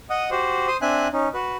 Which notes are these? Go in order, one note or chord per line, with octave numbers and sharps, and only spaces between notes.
D#5 F#5 D#6
F#4 G4 C5
C5 C6 D#6
C4 D4 E5 G#5 F#6
C#4 D#4
F#4 B4